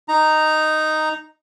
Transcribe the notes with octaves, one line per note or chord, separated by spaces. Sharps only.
D#4 A#5